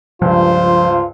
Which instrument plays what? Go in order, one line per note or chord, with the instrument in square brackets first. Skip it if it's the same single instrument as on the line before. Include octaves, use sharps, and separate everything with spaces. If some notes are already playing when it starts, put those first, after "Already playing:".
[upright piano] C#2 G2 [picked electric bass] F3 [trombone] F4 [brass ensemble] C5